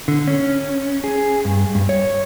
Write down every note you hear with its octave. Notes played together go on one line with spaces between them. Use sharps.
D3
C#4
G#4
G2
G2
C#5